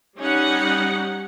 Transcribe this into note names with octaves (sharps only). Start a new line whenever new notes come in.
G3 C#4 D#4 F#5